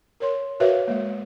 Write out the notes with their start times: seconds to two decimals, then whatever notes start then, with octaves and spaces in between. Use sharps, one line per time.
0.20 A#4 C#5 C6
0.60 F#4 A#4 B4 C#5 E5 F5
0.88 G#3 A#3